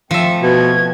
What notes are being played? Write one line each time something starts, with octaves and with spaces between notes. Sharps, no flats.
F3 A3 C4 E5 C#7
B2 G#6